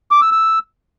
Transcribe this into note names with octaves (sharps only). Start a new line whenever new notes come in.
D6
E6
E6